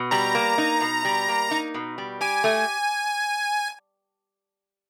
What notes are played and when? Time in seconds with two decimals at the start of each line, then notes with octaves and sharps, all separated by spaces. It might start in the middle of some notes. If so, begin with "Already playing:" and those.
Already playing: B2
0.11 G3 A#5
0.35 A#3
0.58 D#4
0.81 B2
1.05 G3
1.29 A#3
1.51 D#4
1.74 B2
1.98 G3
2.21 G4 G#5
2.44 A3